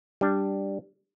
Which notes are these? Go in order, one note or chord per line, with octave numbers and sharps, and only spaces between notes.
G3 D4